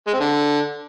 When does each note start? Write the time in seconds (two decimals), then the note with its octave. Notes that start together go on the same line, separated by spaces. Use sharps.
0.07 G#3
0.13 C4
0.20 D3